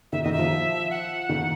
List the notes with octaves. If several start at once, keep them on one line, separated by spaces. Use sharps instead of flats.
D#3 E5
D#3 D#5
E5
F3
F#5
D#3